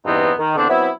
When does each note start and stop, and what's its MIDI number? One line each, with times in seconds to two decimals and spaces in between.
0.05 0.31 40
0.05 0.31 43
0.05 0.31 52
0.05 0.31 59
0.05 0.31 60
0.05 0.31 63
0.38 0.55 51
0.56 0.65 40
0.56 0.65 50
0.56 0.65 59
0.56 0.65 60
0.56 0.65 62
0.69 0.88 54
0.69 0.88 59
0.69 0.88 60
0.69 0.88 64